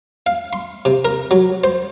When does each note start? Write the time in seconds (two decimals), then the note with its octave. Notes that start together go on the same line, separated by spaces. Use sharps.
0.26 F5
0.53 C6
0.85 C3
1.05 A#4
1.31 F#3
1.64 C5